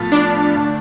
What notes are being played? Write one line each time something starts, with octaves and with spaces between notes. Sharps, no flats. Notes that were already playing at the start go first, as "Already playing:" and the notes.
Already playing: A2 F3 B3 F4 A4
D4
D3 A3